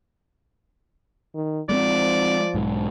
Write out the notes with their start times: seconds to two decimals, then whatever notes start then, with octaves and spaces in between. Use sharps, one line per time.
1.35 D#3
1.69 F3 G#3 A3 C4 D5
2.55 B1 G#2